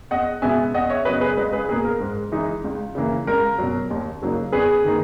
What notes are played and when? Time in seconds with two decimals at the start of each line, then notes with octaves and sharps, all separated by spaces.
0.11 E2 D#5 F#5
0.42 B2 G#3 B3 E5 G#5
0.74 E2 D#5 F#5
0.90 C#5 E5
1.05 C#3 F#3 B3 B4 D#5
1.21 G#4 B4
1.37 C#2 B4 D#5
1.53 G#4 B4
1.69 B2 A#3 G#4
1.85 A#4
2.00 G#2
2.32 E3 G#3 D#4
2.64 C#2
2.95 C#3 E3 A#3
3.27 C#2 A#4
3.58 B2 F#3
3.90 D#2
4.22 C#3 F#3 A#3 D#4
4.52 E2 G#4 B4
4.84 D#3 A#3 D#4